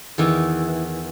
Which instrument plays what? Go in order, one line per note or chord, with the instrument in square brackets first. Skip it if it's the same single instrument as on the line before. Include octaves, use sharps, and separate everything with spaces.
[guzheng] E2 D#3 E3